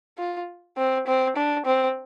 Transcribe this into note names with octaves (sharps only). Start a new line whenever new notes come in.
F4
C4
C4
D4
C4